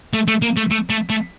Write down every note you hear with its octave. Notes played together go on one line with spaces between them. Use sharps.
A3
A3
A#3
A3
A3
A3
A3